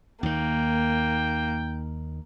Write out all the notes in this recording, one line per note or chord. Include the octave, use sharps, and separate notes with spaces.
D#2 D#3 A#3 G5